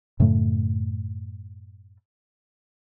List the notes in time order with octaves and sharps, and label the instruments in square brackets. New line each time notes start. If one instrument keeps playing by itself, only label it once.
[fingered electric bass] F#2 A2 C#3 A3